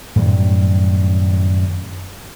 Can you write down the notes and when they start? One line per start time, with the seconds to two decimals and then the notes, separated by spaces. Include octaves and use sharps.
0.16 F#2 A2 D#3 G3